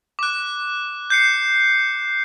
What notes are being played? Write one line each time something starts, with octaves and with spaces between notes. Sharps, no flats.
D6 F#6
G6 C7 C#7